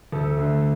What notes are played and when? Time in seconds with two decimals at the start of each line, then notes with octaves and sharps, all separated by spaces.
0.12 D2 A4
0.38 D3 A3